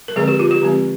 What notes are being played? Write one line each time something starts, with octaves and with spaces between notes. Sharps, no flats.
A#4
D3 F3 G#3 C4 G#4
G4
F4
G4
D3 F3 G#3 C4